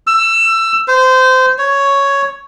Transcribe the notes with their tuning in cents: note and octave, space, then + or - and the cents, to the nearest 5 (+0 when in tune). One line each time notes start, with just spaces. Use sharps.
E6 +20
C5 -20
C#5 +5